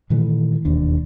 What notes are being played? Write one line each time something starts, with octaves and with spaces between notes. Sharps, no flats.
A#2 D#3 E3 A3
E1 D#2 D4